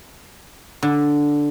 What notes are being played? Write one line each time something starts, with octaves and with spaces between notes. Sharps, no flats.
D3